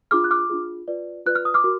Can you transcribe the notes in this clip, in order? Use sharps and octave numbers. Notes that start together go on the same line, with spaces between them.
D4 F4 G#4 D6 F6
F#6
D6 F6
D4 F4 G#4
F4 B4 D5
F4 B4 D5 F#6
F6
D#6
D6 F6
F#4 A#4